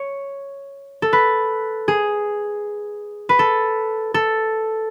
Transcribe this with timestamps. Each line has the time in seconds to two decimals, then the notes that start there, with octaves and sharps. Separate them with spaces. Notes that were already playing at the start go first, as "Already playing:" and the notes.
Already playing: C#5
1.02 A4
1.13 B4
1.88 G#4
3.29 B4
3.39 A4
4.14 A4